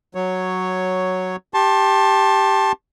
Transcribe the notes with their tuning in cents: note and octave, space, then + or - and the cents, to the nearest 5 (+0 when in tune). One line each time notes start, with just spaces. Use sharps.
F#3 +0 C#5 +0
G4 +0 A5 +0 C6 +35